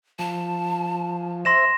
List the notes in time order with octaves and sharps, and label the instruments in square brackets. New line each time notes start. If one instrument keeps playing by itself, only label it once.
[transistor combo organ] F3 [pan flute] A5
[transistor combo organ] C5 E5 [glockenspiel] C6 A#6 E7